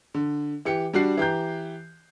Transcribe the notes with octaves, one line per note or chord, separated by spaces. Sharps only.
D3
E3 G4 C#7
G3 D4 F#4 C7
E3 G4 A#5 G6